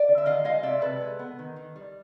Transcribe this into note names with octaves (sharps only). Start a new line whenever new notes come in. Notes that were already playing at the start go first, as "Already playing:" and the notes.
Already playing: D5
D3
E5
D#3 D#5 F5
G#3 D#5 F5
C3 D5 E5
C3 A4 B4
G#3
B3
D#3
D#3
G3